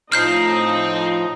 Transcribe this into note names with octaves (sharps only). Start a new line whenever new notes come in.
A2 F3 C4 D#4 F6 G6 C7